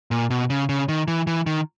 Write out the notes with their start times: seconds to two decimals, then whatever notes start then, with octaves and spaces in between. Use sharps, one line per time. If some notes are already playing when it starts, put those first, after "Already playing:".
0.11 A#2
0.30 B2
0.50 C#3
0.69 C#3
0.89 D#3
1.08 E3
1.27 E3
1.46 D#3